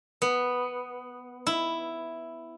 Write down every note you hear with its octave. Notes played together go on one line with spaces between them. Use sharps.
B3
E4